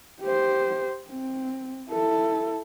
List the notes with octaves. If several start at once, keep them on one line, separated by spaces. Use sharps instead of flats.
G4 C5
C4
E4 A4